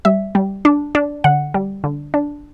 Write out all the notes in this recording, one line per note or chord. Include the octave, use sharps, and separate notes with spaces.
G3 E5
G3
D4
D4
D3 F#5
G3
D3
D4